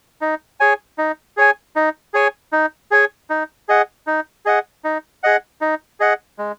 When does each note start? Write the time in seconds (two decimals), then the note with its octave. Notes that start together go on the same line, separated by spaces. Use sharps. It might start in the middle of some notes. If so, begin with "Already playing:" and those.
0.21 D#4
0.60 G#4 C#5 G#5
0.98 D#4
1.37 G#4 C#5 G#5
1.76 D#4
2.14 G#4 C#5 G#5
2.52 D#4
2.91 G#4 C#5 G#5
3.30 D#4
3.68 G#4 D#5 F#5
4.07 D#4
4.46 G#4 D#5 F#5
4.84 D#4
5.23 G#4 D#5 F#5
5.61 D#4
6.00 G#4 D#5 F#5
6.39 G#3